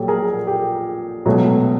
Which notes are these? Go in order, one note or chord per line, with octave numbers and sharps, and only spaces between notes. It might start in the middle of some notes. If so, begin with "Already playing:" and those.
Already playing: A#1 A#2 F#3 G4 A4
G#4 A#4
G4
C#2 B2 F#3 A3